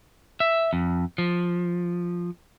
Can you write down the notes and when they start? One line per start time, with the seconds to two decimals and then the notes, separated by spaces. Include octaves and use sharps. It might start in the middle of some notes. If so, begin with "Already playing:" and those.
0.40 E5
0.73 F2
1.18 F3